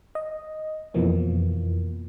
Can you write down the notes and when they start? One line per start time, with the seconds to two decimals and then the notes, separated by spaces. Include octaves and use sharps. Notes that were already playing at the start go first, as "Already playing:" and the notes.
0.15 D#5
0.94 F2 B2 E3 F3 A#3